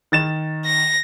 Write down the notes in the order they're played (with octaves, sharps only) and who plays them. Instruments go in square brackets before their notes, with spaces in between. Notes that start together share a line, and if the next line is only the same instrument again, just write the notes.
[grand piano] D#3 A6 E7
[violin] A#6